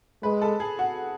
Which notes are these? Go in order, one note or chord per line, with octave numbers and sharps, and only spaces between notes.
G#3 B4
A4
G#4
F#4